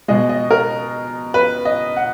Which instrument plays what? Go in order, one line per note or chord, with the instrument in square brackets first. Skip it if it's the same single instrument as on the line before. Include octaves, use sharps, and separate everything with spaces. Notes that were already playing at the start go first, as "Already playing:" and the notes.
[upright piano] B2 G#3 D#5
D#5
A#4
B4
D#5
F#5